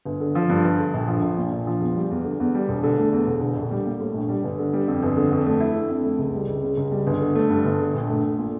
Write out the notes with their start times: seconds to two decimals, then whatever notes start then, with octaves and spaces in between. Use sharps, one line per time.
0.05 G1
0.20 D3
0.35 F3
0.49 G2
0.64 G1
0.79 D3
0.94 A#1
1.08 F3
1.22 A#1
1.37 A#2
1.52 A#1
1.67 F3
1.81 E2
1.96 G3
2.11 E2
2.25 D3
2.40 E2
2.55 G3
2.68 E1
2.84 D3
2.98 A3
3.13 E2
3.26 E1
3.41 D3
3.56 A#1
3.71 G3
3.86 A#3
4.01 A2
4.14 A#1
4.29 G3
4.44 G1
4.58 D3
4.73 G3
4.88 F2
5.03 G1
5.17 D3
5.31 F2
5.46 A3
5.60 E4
5.75 D3
5.89 F2
6.04 A3
6.19 C#2
6.34 G3
6.48 C#2
6.63 C#3
6.77 C#2
6.91 G3
7.07 G1
7.21 D3
7.35 A3
7.50 G2
7.65 G1
7.80 D3
7.94 A#1
8.09 A3
8.24 A#1
8.38 A#2